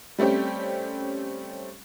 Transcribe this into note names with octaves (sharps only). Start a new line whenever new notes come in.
G3 A3 C4 C#4 G4